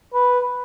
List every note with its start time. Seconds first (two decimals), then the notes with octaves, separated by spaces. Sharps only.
0.14 B4